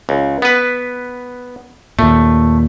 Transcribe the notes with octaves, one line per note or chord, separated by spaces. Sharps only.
C#2
B3 B4
D#2 A#2 A3